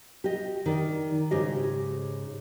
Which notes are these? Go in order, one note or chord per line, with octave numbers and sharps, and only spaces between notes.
G4 D#5
D#3 D5
G#2 C#3 G4 G#4 D#5